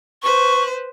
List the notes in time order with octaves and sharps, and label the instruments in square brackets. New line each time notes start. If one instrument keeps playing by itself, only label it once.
[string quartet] B4 C5 [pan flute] C#6